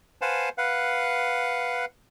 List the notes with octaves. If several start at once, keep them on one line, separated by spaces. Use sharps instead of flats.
B4 C5 F5 F#5 G#5 A5
B4 F5 F#5